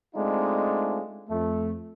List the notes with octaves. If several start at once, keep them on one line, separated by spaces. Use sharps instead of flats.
G#3 A3 C4 D4 D#4 F4
F2 A3